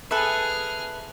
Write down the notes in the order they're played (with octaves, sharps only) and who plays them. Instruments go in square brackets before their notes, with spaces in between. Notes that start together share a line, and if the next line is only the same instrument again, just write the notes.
[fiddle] G#4 F6 [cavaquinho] A4 B4 E5